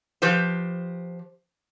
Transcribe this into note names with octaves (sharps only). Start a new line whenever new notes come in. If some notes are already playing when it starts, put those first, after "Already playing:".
F3 G4 B4 C5